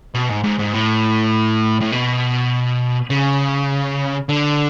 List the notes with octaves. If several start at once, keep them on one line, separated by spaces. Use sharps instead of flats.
B2
G#2
G#2
G#2
A2
A2
B2
C#3
D3